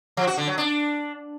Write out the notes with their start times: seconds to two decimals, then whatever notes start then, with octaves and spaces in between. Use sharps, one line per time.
0.17 F3
0.27 F#4
0.37 D3
0.48 F#3
0.58 D4